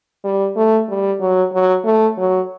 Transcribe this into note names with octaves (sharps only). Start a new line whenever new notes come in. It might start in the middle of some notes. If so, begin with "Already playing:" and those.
G3
A3
G3
F#3
F#3
A3
F#3